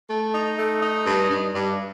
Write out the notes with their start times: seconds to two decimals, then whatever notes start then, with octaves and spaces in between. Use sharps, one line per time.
0.10 A3
0.34 D#4
0.59 A3
0.82 D#4
1.06 G2
1.30 G2
1.55 G2